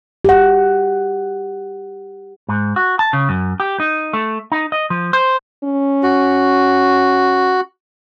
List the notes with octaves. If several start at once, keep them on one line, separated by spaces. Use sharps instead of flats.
G4 F#5
G#2
F#4
A5
C#3
F#2
G4
D#4
A3
D#4
D#5
F3
C5
C#4
F#4